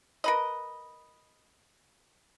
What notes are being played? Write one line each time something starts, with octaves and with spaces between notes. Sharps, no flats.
A#4 B4 D#5